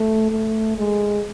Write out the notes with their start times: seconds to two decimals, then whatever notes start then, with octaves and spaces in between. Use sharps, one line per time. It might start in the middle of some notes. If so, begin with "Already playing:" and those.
Already playing: A3
0.31 A3
0.78 G#3